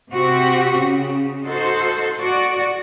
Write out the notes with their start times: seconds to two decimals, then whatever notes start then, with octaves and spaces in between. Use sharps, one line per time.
0.12 C3 C4 F#4 G4
0.77 C#3
1.44 D#4 F#4 A4 C5
2.21 F#4 D5